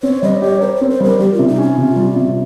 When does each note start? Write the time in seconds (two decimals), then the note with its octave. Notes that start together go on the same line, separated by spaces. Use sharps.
0.03 C4 C#5
0.23 G3 D#5
0.42 G4 C#5
0.61 A#4 C5
0.76 C#5
0.81 C4
0.90 C5
1.00 G3 A#4
1.19 G3 G4
1.34 F4
1.39 C3
1.48 D#4
1.58 C#4 F4
1.78 C3
1.96 G3
2.16 C3